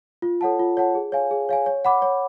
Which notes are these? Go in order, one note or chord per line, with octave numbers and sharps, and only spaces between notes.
F4
A4 C#5 F#5 A5
F4
A4 C#5 F#5 A5
G#4
C#5 F5 G#5
G#4
C#5 F5 G#5
C#5
F#5 B5 D6
C#5